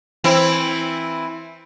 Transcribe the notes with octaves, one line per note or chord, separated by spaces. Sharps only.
E3 C4 E4